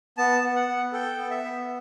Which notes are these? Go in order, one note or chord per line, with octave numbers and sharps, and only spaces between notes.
B3 A5
B3
F#5
B3
A4 G5
B3
E5
B3